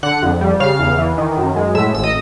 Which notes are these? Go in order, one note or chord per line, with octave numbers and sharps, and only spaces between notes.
D3 F#5 F#6
F2
G3
C#3 F5 F6
E2
E3
D#3
F#2
G#3
A2 E5 E6
A1 E6
D#5 D#6